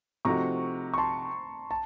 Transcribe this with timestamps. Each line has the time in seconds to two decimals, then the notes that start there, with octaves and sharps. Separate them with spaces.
0.25 C3 F3 A3 D#4 F#4 A#5 C#6
0.94 C#6
0.98 A5 C6
1.71 A5